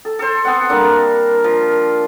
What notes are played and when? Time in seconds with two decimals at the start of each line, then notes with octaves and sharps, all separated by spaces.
0.05 A4
0.19 A4 C5
0.45 B3 C4 F#5
0.69 G3 A#3 D4 A#4
1.44 F3